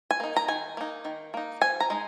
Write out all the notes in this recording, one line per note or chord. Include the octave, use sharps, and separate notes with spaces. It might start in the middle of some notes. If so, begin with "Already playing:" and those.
G#5
A#3 D#4
A#5
D#3 G#5
A#3 D#4
D#3
A#3 D#4
F3 G#5
A#5
G#3 D#4